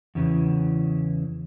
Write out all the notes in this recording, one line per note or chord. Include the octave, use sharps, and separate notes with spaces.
E2 C#3 E3